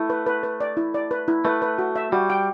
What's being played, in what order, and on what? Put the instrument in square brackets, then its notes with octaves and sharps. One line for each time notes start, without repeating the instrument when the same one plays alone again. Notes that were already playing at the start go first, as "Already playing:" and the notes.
Already playing: [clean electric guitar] A3 [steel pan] E4
[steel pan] B4
B4
B4
D5
E4
D5
B4
E4
[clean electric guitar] A3 [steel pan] B4
[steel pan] B4
F#4
E5
[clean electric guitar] G3 [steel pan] F#4
[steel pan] G5